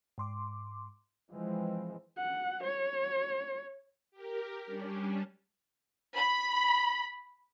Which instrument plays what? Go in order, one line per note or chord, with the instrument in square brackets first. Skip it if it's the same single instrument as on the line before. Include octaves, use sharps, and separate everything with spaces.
[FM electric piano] G#2 C6 D6
[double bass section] E3 F3 G#3 C4
[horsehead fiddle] F#5
C#5
[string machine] G4 A#4
G3 C#4 D4
[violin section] B5